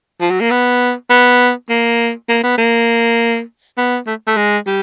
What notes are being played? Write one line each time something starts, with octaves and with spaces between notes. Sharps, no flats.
F3
F#3
A#3
B3
B3
A#3
A#3
B3
A#3
B3
A3
A3
G#3
G3